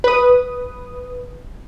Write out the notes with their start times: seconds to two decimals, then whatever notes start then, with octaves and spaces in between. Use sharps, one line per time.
0.04 B4 D#6